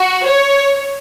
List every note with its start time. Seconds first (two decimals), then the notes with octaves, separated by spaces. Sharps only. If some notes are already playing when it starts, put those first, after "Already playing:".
Already playing: F#4
0.28 C#5